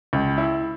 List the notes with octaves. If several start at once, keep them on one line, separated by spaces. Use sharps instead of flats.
C#2
E4